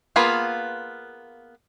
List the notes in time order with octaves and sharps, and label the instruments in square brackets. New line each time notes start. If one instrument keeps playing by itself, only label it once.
[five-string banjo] A#3 B3 F4 G#4 B4